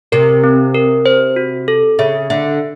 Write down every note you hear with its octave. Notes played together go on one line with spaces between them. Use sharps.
C3 A#4
C4
A#4
C5
F#4
A4
C#3 E5
D3 E5